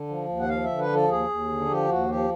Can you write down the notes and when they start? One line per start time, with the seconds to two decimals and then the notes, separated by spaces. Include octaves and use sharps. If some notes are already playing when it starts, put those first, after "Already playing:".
Already playing: D3
0.08 F3
0.28 D#2
0.40 F#5
0.49 F3 F5
0.64 D3 E5
0.78 B4
0.89 F3
0.94 A4
1.08 D#2 G#4
1.28 D#2
1.49 D3
1.69 F3 G4
1.89 D#2 F#4
2.09 F3 G4